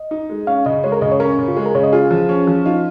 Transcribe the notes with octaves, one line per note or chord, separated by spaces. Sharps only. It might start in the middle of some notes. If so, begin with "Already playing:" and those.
Already playing: D#5
D#4
G#3
C#4 F5
C#3 D#5
G#3 C#5
A#4
C#3 D#5
C#5
C#4 A#4
C#3
F4
G#3 G#4
A#4
C#3 C#5
D#5
F4 G#4
F3
C#4
F3
D#4 F4